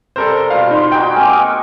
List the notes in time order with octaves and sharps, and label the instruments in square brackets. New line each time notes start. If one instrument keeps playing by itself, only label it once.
[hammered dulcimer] C3 G3 [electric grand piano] A4 A#4 C5
[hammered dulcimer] B2 G3 F4 [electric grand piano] F5
[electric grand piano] D#4 [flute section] C6
[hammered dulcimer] D#4 F#4 G#5 [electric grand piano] G5
[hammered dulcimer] G#3 A#3 C4 [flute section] G#5 D6 F6
[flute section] C#6